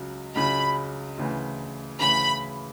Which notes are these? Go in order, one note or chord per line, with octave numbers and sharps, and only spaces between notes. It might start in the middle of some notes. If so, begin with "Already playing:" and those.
Already playing: C#2 C#3 F#3
C#2 C#3 F#3 B5
D2 C#3 E3
D2 C#3 E3 B5